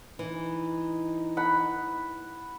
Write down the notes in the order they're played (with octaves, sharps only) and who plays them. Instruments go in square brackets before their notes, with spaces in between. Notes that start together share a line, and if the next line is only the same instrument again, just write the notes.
[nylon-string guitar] E3 [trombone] D#4
[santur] F#5 B5